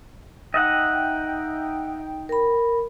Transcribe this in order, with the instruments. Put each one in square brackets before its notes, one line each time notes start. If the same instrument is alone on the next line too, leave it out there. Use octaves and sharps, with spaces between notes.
[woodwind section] D#4 G5 [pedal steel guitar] D#5 E5 F#5
[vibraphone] A#4 B5